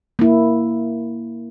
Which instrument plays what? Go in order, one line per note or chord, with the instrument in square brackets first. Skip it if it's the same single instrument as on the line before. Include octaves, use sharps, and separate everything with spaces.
[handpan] A#3 E4